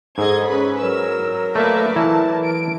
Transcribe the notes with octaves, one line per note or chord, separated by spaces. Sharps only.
G#2 G#4 A4 D#5 G#6
C#4 B4 B5
F#3 A#4 E6
A3 A#3 B4 D5 E5
E3 E4 A4 A5
D7